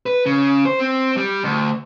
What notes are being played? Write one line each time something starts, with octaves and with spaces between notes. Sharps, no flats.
B4
C#3
C5
C4
G3
D2